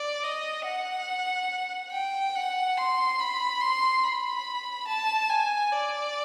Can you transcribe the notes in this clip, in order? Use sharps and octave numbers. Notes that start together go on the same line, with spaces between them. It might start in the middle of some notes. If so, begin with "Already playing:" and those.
Already playing: D5
D#5
F#5
G5
F#5
C6
B5
C6
B5
A5
G#5
D5